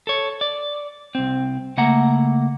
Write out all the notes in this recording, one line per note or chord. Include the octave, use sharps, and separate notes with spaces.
A4 C#5
D5
C2 C4
C#3 A3 A#3 F#5 A#5